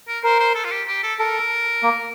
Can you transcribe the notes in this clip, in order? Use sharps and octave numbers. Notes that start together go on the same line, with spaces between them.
A#4
A#4 C5
C5
A4
F4
G4
G4
A4
A4 A#4
A#3